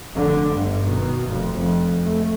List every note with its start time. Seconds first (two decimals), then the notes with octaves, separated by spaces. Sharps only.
0.16 F1 D3
0.54 G1 G2
0.87 B2 D#3
1.27 F1 F2
1.58 F2
2.05 A3